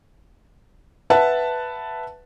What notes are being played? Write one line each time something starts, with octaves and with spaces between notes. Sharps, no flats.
B4 E5 F#5 A5